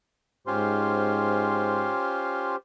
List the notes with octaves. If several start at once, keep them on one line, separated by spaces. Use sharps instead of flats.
G#2 C#4 F4 G4 C5 C6